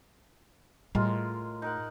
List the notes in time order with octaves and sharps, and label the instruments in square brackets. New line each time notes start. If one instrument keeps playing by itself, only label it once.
[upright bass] A2 [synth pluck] G3 [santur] G#3 F4 A#4
[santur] D#4 A#4 F#5